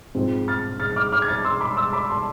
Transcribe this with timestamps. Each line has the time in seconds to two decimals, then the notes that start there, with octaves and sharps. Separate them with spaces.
0.15 G#2 F3 G#3 C4
0.48 F6 A6
0.80 F6 A6
0.96 D6 F6
1.12 D6 F6
1.22 G#6
1.28 F6 A6
1.44 C6 E6
1.60 B5 D6
1.76 C6 E6
1.93 B5 D6
2.09 A5 C6